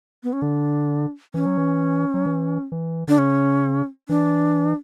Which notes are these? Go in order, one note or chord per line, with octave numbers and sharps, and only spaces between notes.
B3
C#4
D3 D4
E3 C#4
F#3
E3
F#3
E3
E3
D3 D4
C#3 C#4
E3 D4